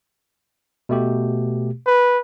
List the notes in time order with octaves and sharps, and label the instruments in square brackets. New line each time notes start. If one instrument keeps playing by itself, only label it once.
[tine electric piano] B2 A3 G4
[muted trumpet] B4